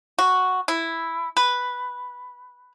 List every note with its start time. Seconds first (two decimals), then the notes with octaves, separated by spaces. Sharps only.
0.19 F#4
0.68 E4
1.37 B4